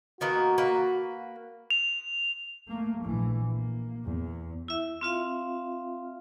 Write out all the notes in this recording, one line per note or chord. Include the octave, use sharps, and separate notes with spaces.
D#3 A#3 B3 F#4
A#3 B4
F7
A3 A#3
A#1 E3
A#3
E2
E4 E5
C4 F4 E5 F5